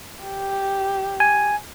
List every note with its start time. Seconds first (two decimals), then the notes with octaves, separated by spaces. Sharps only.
0.25 G4
1.20 G#5